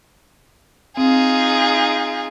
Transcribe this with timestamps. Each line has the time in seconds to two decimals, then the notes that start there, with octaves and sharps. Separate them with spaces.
0.97 C4 D#4 F4 G#4